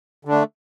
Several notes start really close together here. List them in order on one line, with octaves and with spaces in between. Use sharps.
D3 D4 A3